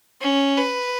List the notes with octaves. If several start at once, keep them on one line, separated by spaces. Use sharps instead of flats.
C#4
B4